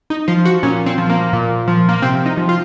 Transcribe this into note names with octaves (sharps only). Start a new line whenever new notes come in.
D#4
F3 F4
F#4
A#2 C#4
C4
F3
A#3
A#2
F3
A#3
C3 C4
D#4
F3
F4